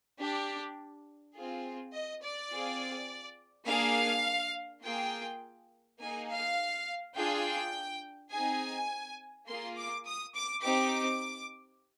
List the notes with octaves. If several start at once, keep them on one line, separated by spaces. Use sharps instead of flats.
D4 G4
C4 F4 G#4
D#5
D5
C4 F4 G#4
A#3 D4 G#4 F5
A#3 F4 G#4 G5
A#3 D#4 G#4 G#5
F5
D4 F4 G#4 G5
C4 D#4 G#4 G#5
A#3 F4 G#4 C6
D6
D#6
D6
C4 D#4 G4 D6